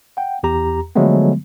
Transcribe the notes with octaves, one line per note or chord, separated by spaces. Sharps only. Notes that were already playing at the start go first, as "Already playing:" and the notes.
F#5 G5
E2 G4 A#5
D3 F3 F#3 G#3 A3 B3